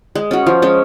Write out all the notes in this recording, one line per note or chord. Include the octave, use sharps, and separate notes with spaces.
G#3
C#4 F#4
F3
G#3 C#4